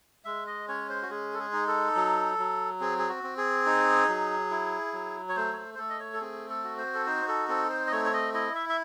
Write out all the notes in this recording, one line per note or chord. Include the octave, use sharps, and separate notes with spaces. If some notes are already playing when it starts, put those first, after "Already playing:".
G#3 E5
D#5
C#4 C#5
C5
F#4
G#3 G#4
A4
G#4
D#4
A4
F#3
F#3
C4 G#4
G#4
F#4
C4
G#4
D#4
F#3
E4
F#3
C#5
A3 C5
C#5
C5
C5
A3 A4
D#5
C#5
A4
C4 G#4
A4
F#4
C5
A4
D#4 C5
A4
C4 A4
C5
D#5
A3 C#5
C#5
D#5
E4 D#5
E5
E5